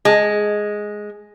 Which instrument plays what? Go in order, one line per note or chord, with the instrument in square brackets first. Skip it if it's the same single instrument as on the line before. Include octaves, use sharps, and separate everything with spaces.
[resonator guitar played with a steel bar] G#3